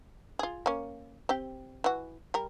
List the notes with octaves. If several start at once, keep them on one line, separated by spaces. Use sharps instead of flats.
F4 G#4
A#3 C#4
C4 G4 G5
E3 F#4
G3 A#4